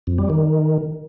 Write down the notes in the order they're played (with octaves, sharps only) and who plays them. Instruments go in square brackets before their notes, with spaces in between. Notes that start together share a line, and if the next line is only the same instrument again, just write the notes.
[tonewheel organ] F2
G3
D#3